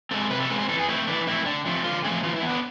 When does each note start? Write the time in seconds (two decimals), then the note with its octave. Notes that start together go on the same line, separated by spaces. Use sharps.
0.11 G#3 C4 A4
0.30 C3 B4
0.40 A4
0.50 G#3 C4 B4
0.59 C5
0.68 E3 A4
0.79 G#4
0.88 A3 C4 E4
1.07 E3 D4
1.27 A3 C4 E4
1.46 D3 D4
1.66 F3 A3 C4
1.84 D3 F4
2.04 F3 A3 C4 G#4
2.23 E3 F4
2.36 E4
2.42 B3
2.49 D4